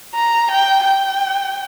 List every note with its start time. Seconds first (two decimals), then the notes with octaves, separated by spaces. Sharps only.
0.15 A#5
0.51 G5
0.85 G5